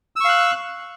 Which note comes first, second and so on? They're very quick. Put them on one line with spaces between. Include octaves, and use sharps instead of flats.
E6 C#6 F5 F#6